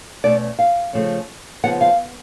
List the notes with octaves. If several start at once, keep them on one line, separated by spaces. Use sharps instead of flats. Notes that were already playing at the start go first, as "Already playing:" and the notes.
B2 A3 C#4 D5
F5
C#3 F3 A3 C#4
C#3 F3 B3 F#5
F5